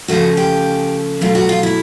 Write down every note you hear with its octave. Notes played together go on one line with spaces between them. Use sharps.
C#3 F3 A3 C#4 F#4
G4
B2 F#3 A3 F4
F#4
F4
E4